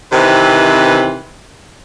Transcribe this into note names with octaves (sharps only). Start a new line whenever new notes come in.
C3 D#3 E3 C4 B4